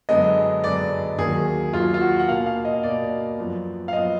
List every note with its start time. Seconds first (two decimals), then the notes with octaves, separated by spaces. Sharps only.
0.09 F#2 D3 G#3 B3 D#5
0.64 F#2 D3 G#3 B3 D5
1.18 D#2 D#3 F#3 G#4
1.73 D#2 D#3 F#3 F4
1.94 F4
2.01 F#4
2.19 F#5
2.28 B2 A#3 F5
2.46 F5
2.65 D#5
2.83 B2 A#3 D5
3.38 F#2 F3 B3
3.88 F5
3.93 F#2 F3 B3 D#5